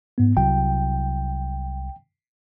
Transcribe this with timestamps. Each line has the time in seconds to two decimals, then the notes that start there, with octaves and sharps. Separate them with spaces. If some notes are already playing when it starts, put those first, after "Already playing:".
0.18 G#2 B3
0.37 C2 F#3 G5